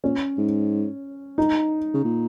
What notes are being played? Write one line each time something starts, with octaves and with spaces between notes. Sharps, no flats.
A#2 C#4
G#2
D#4
C#3
A#2